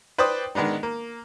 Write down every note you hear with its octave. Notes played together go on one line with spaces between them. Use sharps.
B4 C5 D5 G5 D6 D#6
D#3 G#3 B3 D4 D#4
A#3